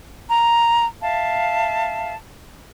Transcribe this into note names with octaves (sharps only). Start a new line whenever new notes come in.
A#5
E5 F5 A5